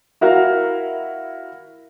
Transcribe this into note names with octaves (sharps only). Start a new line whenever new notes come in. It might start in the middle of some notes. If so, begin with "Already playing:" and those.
E4 F#4 A#4 F5